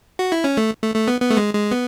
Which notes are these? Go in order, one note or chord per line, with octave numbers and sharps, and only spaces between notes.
F#4
E4
C#4
A3
A3
A3
B3
B3
A3
G#3
G#3
B3